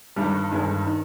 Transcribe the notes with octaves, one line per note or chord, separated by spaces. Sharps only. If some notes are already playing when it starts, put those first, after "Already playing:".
G1 G2 D#3 G3
G1 G2 D#3 G#3
D#3